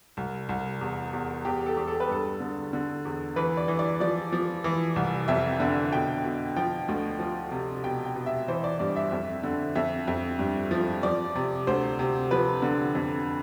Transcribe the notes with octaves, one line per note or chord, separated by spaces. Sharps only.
C2
C2
E2
E2
E2 G4
A4
E2
A4
B4
G2 A4
D3
D3
E2
E3 B4
D5
E3
D5
F3 D5
F3
E3
C2
F2 E5
D3
B2 G5
B2
F3 G5
D2
F3
C3
B2 G5
G5
B2
E5
E3 C5
D5
G2 D5
E5
F2
D3
F2 E5
F2
G2
F3
F3 D5
C3
D2 C5
C3
F3 B4
D3
F2